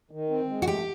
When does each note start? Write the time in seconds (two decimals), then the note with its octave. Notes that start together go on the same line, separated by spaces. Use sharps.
0.11 D#3
0.30 C4
0.49 G#3
0.62 F#4
0.67 A3 G4